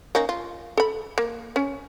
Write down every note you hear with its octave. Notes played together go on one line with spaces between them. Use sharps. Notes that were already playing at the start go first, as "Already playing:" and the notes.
A#3 C#4 D#4
F4
A4 B5
A#3
C#4